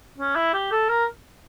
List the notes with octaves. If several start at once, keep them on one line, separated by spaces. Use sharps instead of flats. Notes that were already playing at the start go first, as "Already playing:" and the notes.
C#4
E4
G4
A4
A#4